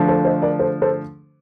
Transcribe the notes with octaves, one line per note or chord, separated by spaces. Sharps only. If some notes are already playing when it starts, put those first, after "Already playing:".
Already playing: D3 F3 A3 D4
A4 C5
C5 D#5
A#4 D5
A4 C5
A4 C5